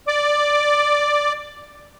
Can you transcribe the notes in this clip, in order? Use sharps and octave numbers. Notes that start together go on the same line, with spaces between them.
D5 D6